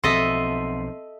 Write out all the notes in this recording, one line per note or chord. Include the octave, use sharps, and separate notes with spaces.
B1 F3 C4 A4 D#5 E5 C6 C7